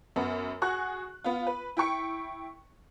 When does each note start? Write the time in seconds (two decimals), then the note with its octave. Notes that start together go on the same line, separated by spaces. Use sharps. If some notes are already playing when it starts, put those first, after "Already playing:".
0.16 F#2 B3
0.62 F#4 G#4 C#6 F#6
1.24 B3 F4
1.47 B4
1.77 E4 G5 C#6 C#7